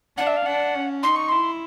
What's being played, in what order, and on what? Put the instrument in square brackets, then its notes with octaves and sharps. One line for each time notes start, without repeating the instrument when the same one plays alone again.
[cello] D4 [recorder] F#5
[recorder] E5
F5
[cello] D4 [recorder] F#5
[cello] C#4
[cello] D#4 [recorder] C6
[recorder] C#6
[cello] E4 [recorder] C6